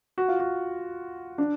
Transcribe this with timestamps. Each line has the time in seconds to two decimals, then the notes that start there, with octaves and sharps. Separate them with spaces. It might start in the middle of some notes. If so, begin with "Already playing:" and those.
0.18 F#4
0.28 F4
0.40 F#4
1.38 D4